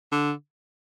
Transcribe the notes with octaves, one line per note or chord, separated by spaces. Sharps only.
D3